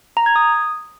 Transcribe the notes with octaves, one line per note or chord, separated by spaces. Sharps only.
A#5
G#6
D#6